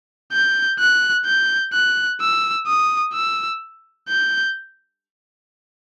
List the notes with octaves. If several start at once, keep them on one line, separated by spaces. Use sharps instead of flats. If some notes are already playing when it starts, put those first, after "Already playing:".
G6
F#6
G6
F#6
E6
D#6
E6
G6